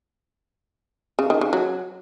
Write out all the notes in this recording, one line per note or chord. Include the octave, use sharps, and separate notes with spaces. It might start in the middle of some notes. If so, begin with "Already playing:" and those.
C#3
D#3
C#3
F#3